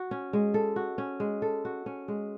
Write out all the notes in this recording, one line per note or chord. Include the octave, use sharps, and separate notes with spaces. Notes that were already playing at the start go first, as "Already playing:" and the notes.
Already playing: F#4
C#4
G#3
A4
F#4
C#4
G#3
A4
F#4
C#4
G#3